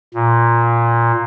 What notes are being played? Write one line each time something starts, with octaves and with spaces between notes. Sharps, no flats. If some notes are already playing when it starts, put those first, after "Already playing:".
A#2